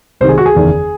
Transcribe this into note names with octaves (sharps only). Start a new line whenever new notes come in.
C2 C3 D#3 C5
G#4
F#4
G#4
F#1 E2 D#3